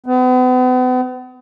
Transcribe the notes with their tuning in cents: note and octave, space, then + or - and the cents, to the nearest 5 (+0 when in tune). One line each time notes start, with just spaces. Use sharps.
B3 +40